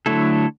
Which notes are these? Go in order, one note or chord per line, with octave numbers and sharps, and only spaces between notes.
D3 F#3 A3 E4 A4